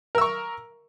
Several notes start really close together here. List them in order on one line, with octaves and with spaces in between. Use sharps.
A#4 E6 C#6